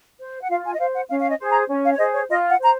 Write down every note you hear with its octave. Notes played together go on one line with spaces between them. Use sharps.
C5
F#5
F4 F5
G#5
D#5
C5 F5
F#5
C#4 F5
F5
D#5
G#4 C5
A#5
C#4
F5
C#5
G#4 C5 D#5
C#5
F4 D#5
F#5
C5 A#5